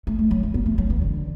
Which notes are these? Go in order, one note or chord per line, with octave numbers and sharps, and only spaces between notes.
A3
A3
F#3
A3
B3
A3
F#3
E3
D3